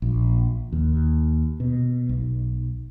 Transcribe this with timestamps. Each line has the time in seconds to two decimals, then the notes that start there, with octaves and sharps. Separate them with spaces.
0.02 A#1
0.72 D#2
1.60 B2
2.09 B1